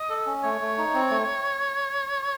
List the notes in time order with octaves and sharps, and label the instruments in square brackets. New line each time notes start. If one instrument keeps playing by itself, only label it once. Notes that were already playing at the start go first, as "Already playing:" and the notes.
Already playing: [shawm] D#5
[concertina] A4
C#4
[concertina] A3 [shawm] C#5
[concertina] A3
D#4
C4
A3